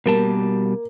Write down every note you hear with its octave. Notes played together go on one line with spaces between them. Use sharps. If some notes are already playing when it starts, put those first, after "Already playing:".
B2 G3 A#3 A5